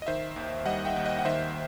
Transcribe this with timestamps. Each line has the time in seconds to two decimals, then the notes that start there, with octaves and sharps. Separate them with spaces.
0.02 D#5
0.07 D#3 C5 E5
0.36 D#2
0.66 G3 D#5 F#5
0.85 E5 G5
0.96 D#2
1.05 D#5 F#5
1.19 F#5
1.25 D#3 C5 E5